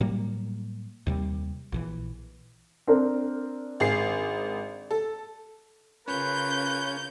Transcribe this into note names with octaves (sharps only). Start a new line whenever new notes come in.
A2 F#3 G3 A#3
D#2 C3 G3
A#1 C#3 E3
C4 D4 A#4
G#1 G#4 C7
A4
C#3 C#4 F4 A#4 B4 G6